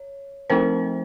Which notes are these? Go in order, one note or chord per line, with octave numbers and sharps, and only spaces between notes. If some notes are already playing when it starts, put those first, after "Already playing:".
Already playing: C#5
F3 A3 C4 D#4 A#4 C5